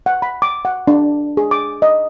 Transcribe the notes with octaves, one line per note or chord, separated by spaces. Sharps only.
F#5
B5
D6
F#5
D4
G#4
D6
D#5